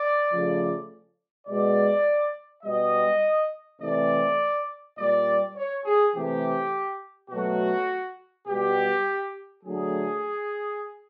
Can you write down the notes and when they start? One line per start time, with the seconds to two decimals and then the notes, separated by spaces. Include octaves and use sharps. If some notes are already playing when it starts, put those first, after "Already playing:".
Already playing: D5
0.30 C#3 F3 A3
1.47 B2 G#3 D5
2.64 B2 G3 D#5
3.80 C3 E3 A3 D5
4.97 A#2 G3 D5
5.55 C#5
5.85 G#4
6.14 C3 E3 A3 G4
7.31 B2 F#3 A3 F#4
8.47 B2 G3 G4
9.64 D3 F#3 A3 G#4